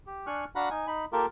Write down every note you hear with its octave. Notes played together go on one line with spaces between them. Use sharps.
G4
D4 G#5 C#6 F6 F#6
D4 F#4 F5 F#5 A#5 B5
D#4 G#5
D#4 B5
A#3 F4 G4 A4 A#4